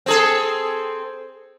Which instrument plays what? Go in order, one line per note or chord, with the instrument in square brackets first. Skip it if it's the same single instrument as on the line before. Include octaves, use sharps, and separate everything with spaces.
[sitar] C4 G#4 A4